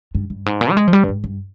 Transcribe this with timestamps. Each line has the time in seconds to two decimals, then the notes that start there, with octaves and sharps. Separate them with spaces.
0.15 G2
0.30 G2
0.46 G#2
0.61 A#2
0.71 G3
0.77 G#3
0.88 F3
0.93 G3
1.04 G2
1.09 G#2
1.24 G2